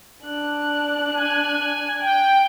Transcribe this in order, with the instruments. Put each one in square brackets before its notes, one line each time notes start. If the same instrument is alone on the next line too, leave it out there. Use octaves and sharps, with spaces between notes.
[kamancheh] D4 F#6
[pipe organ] G#5
G5